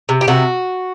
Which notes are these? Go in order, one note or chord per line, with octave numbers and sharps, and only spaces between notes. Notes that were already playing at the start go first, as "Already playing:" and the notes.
C3
G4
C3 F#4